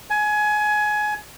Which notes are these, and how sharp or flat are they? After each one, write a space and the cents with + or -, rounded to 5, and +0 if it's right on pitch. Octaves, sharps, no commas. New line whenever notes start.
G#5 +20